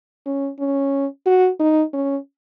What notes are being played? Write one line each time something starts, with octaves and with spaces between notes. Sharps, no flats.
C#4
C#4
F#4
D#4
C#4